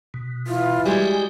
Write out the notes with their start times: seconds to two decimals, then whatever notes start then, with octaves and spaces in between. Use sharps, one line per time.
0.14 B2
0.47 E3 E4 F4
0.85 G3 G#3 F#4 G4 G#5